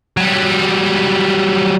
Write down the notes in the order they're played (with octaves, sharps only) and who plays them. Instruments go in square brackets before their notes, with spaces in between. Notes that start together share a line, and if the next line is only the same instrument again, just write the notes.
[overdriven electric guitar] F#3 G3